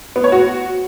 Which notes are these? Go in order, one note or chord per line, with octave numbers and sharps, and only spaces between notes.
B3
C#5
F#4